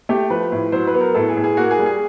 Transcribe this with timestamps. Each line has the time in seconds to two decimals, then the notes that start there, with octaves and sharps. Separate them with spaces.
0.09 A3 G4
0.30 F3 B4
0.52 A2
0.72 F#3 C5
0.87 B4
0.94 B3
1.01 A#4
1.14 A2 A4
1.29 G#4
1.37 A2
1.44 G#4
1.57 A#3 F#4
1.71 G#4
1.79 G3
1.86 G#4